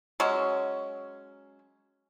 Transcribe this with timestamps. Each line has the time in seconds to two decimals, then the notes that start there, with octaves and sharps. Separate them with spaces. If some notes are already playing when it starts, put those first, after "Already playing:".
0.20 F#3 G#3 C#4